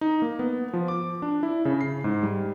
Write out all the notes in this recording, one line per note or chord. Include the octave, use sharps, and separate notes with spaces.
D#4
A#3
B3
F3
D6
D4
E4
C#3
C7
G#2
G3